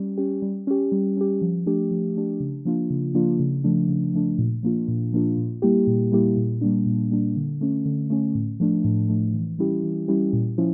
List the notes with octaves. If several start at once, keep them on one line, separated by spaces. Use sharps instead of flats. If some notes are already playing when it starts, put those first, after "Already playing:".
Already playing: G3 C#4 G4
C#4 G4
G3
C#4 G4
G3
C#4 G4
F3
A3 D4 G4
F3
A3 D4 G4
C#3
F3 A#3 D4 F4
C#3
F3 A#3 D4 F4
C#3
F3 A3 D4
C#3
F3 A3 D4
A#2
F3 A#3 D4 F4
A#2
F3 A#3 D4 F4
A#2
G3 A#3 E4 G4
A#2
G3 A#3 E4 G4
A#2
G3 A#3 D4
A#2
G3 A#3 D4
D3
A3 C#4
D3
A3 C#4
A2
F3 A3 D4
A2
F3 A3 D4
E3
G3 C#4 E4 G4
E3
G3 C#4 E4 G4
A#2
F3 C#4 E4